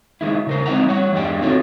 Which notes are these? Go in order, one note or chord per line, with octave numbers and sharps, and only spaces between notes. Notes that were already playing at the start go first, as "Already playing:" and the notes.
D#3 G#3 E4
C#3 A#4 C5
G#3 C4 D#4 E4 F#5 A#5
G3 C#5 F#5
E2 G2 G3 G#3 D5 G5
C4 D#4 F4 F#4 A4 C#5